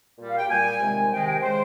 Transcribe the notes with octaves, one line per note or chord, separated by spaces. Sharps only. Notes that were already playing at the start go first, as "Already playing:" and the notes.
A#2 G3
F5
G5
A#2 G3 G#5
C3 D#3 G#3
C3 D#3 G#3 G5
G5
C#3 G#3 C5